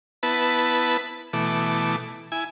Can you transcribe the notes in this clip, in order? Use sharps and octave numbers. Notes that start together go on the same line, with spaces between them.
B3 E4 B4 A5
B2 E3 A3 D6
E4 G#5